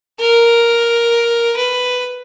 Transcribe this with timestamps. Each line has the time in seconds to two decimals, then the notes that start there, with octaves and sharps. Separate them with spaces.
0.20 A#4
1.56 B4